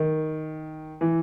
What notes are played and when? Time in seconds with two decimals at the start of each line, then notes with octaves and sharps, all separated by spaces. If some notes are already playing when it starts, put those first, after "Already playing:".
Already playing: D#3
1.01 E3